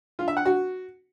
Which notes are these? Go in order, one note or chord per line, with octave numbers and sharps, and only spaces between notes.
F4
E5
F#5
F#4